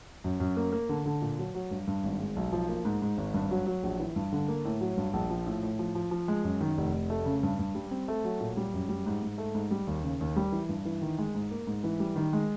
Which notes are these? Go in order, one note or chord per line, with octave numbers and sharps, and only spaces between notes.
F#2
F#2
A#3
A#3
D3
D3
A#2
F#3
F#3
G2
G2
G#1
G#3
B1
F3
A#3
G#2
G#2
G#1
G2
F#3
F#3
A#1
E3
G2
D3
A#3
A2
F#3
G2
A#1
F3
A2
A2
F3
F3
F3
G#3
F#2
D#3
F1
F1
A3
C#3
G2
G2
G3
C4
A3
F#3
A#2
G3
F#2
G3
G#2
G#2
A3
G#2
G3
D#2
C#3
D#2
G3
E3
G2
E3
D#3
G#3
G#2
A#3
G#2
E3
G3
D#3
G#3